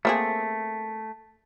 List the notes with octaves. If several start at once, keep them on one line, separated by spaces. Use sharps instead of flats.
A3 A#3 C4 G#4